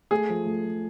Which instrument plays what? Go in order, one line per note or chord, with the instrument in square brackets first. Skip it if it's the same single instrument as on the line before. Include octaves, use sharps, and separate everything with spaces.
[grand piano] A3 [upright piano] G#4
[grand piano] F3
A3
F3